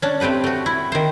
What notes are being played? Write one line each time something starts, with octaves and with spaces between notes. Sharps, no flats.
C#4 D4
A3 C4 G4 B4 F#5
A3 F#4
E4
D#3 C5